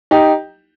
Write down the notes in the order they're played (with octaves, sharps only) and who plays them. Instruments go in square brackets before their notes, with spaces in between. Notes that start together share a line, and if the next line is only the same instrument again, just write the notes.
[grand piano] D#4 G4